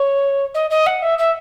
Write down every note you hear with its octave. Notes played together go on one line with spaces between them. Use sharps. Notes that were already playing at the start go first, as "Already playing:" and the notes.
Already playing: C#5
D#5
D#5
F#5
E5
E5